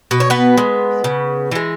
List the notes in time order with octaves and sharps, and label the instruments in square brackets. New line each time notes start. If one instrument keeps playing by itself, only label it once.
[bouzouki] B2 B4
C#5
B3 B4
G#3
C#3
E3 G#3